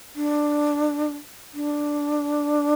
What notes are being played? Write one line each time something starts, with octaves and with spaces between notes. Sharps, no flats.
D4
D4